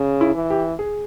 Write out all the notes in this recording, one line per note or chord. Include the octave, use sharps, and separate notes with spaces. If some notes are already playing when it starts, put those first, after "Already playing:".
Already playing: C#3
E4
E3
G4
G#4